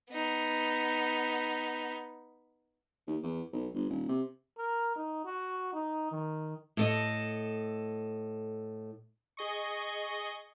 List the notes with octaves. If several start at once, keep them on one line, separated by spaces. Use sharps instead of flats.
B3 D#4
D#2
E2
B1
G1
D#1
C3
A#4
D#4
F#4
D#4
D#3
A2 A4 D#5
G#4 D#5 C#6